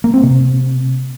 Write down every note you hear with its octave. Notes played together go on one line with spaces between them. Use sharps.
A#3
C4
C3